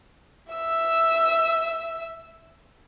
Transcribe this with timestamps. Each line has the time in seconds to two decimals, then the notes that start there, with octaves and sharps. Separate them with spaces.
0.53 E5 E6